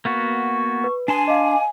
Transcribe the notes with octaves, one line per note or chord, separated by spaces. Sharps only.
A#3 B3 F#4 C#6
B4
D4 G#5 A5 C6
D#5 F5 D6